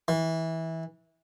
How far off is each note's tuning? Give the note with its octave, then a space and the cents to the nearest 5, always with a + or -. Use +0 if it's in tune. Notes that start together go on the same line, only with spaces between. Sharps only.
E3 -20